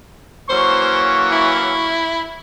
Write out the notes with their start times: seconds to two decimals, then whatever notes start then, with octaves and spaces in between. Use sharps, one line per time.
0.49 E3 F#3 A#3 C#4 C5 C#6
1.32 E4